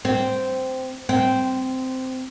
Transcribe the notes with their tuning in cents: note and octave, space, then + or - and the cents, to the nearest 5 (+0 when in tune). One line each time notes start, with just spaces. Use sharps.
C4 -10
C4 -10